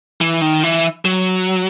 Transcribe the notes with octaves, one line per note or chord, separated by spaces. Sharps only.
E3
D#3
E3
F#3